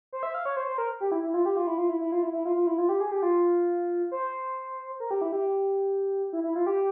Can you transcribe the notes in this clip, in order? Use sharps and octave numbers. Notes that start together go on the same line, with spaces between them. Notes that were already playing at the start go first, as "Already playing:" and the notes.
C5
E5
F5
C#5
C5
C5
A#4
G4
E4
E4
F4
G4
F4
E4
F4
E4
E4
F4
E4
E4
F4
F4
E4
F4
G4
G#4
G4
F4
C5
A#4
G4
E4
G4
E4
E4
F4
G4